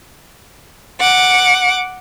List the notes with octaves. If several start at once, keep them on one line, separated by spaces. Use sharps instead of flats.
F#5 D6